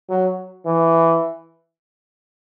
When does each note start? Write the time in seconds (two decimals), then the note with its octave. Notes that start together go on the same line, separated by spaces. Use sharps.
0.10 F#3
0.66 E3